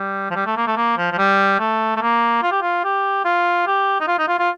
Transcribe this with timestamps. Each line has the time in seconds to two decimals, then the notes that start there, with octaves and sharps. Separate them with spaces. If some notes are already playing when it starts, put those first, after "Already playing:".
Already playing: G3
0.31 F3
0.35 G3
0.46 A3
0.57 A#3
0.67 A3
0.77 A#3
0.98 F3
1.12 F3
1.18 G3
1.59 A3
1.96 A3
2.01 A#3
2.43 F4
2.52 G4
2.62 F4
2.84 G4
3.25 F4
3.67 G4
4.00 D#4
4.07 F4
4.19 D#4
4.28 F4
4.39 F4